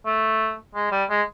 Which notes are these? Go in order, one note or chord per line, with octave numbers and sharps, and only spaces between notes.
A3
G#3
G3
G#3